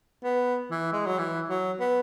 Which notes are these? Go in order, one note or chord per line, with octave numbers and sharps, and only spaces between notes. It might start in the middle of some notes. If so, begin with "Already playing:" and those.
B3
E3
G#3
F#3
E3
F#3
B3